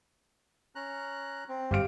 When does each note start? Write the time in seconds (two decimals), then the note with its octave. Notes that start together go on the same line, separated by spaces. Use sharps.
0.75 C#4 A#5 F#6
1.49 C4
1.71 G1 G4 F5 D7